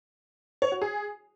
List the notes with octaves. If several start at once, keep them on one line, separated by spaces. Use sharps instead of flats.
C#5
F#4
G#4